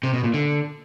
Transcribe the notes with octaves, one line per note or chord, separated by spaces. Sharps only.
C3
B2
A#2
D3